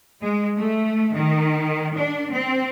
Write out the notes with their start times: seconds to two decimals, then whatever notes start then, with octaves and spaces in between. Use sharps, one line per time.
0.22 G#3
0.57 A3
1.15 D#3
1.97 D4
2.33 C4